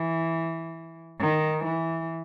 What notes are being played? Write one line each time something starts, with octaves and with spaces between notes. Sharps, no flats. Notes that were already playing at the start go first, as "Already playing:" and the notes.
Already playing: E3
D#3
E3